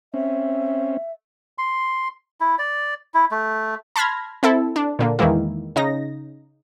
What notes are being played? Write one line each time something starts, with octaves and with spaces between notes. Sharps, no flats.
C4 C#4 E5
C6
E4
D5
E4
A3
A5 B5 C6 F6 G#6 A#6
C4 E4 A4
D4
A#2 D3 A#3
E2 D#3 E3 G#3 A#3 E4
C#3 D#4 A#6